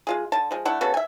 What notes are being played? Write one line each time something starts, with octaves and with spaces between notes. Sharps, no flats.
G#3 F4 G#4
D3 A5
F3 G#3
A3 D4 E4 F#5
C#3 B3 F#4 A4
E5 G#5